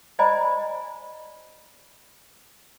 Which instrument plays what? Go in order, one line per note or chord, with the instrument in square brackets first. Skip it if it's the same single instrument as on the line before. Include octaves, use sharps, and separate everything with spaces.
[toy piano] C5 D5 D#5 G#5 A#5 B5